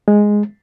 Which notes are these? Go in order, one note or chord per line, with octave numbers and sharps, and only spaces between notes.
G#3